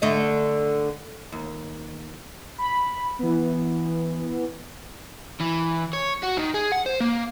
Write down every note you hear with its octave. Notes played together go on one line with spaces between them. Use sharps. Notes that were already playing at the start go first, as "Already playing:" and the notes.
D3 A3 D#5
D#2
B5
E3 B3
E3
C#5
F#4
D#3
G#4
F#5
C5
A#3